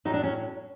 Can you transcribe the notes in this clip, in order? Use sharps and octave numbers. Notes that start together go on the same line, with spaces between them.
A2 F#3 D#4
D4
C#4